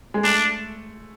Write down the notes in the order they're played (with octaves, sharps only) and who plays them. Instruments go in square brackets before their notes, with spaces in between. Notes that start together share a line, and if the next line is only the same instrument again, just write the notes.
[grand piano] G#3
[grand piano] A3 [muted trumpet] D4